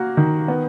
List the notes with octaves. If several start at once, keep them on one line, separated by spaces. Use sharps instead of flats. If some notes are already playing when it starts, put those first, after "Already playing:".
Already playing: A#3 F#4
D#3
B3